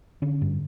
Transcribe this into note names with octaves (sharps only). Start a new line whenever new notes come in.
D3 C#4
G2